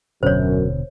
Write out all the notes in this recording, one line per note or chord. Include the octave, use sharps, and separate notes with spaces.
D#1 F#2 B2 D3 C5 C#5